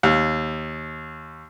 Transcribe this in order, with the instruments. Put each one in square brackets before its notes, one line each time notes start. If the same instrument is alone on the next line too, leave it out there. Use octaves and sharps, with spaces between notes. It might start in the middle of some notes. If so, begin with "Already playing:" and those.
[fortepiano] D#2